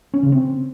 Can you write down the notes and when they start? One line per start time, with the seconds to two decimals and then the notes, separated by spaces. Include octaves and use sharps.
0.14 C#4
0.23 C#3
0.32 C4